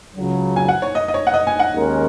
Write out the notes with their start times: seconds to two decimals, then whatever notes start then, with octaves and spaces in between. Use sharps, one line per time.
0.16 C#2 C#3 F#3
0.56 G#5
0.68 F#5
0.82 C#5
0.95 D#5
1.08 D#5
1.14 C#5
1.27 F#5
1.34 D#5
1.47 G#5
1.59 F#5
1.73 D#2 D#3 G#3 C#4 A#4